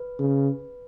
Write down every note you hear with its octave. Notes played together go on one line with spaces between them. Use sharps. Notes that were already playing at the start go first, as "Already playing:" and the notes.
Already playing: B4
C#3